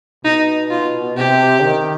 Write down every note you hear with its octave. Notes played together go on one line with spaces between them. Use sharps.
B2 D#4
F4
C3 G4
D#3